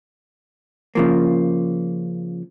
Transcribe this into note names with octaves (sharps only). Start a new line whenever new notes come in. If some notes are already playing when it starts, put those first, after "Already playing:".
C#3 F3 A#3